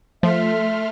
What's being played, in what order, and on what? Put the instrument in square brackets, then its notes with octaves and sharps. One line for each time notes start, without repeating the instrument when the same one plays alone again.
[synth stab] F3 [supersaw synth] A3 C6 F6 [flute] E5